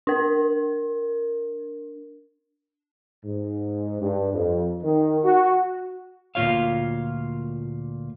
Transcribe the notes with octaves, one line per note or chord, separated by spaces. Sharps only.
D4 A#4
G#2
G2
F2
D#3
F#4
D2 A#2 F3 F4 C#5 F5